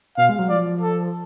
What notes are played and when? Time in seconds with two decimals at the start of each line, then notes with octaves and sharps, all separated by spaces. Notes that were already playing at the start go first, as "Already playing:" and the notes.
0.18 B2 F5
0.29 G#3
0.39 F#3
0.49 F3 D5
0.82 A4